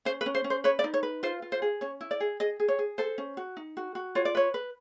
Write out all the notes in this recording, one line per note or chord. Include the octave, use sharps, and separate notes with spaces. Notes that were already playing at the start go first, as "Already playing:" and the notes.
C#4 C5
B4
C#4
C5
C#4
C5
B4 C#5
D5
D#4
C#5
B4
F4 C5
F4
C5
G#4
C#4 C#5
E4
D5
G#4
G#4 D#5
G#4
C#5
G#4
A4 C5
C#4
F#4
D#4
F#4
F#4
F4 C#5
D5
B4 C#5
B4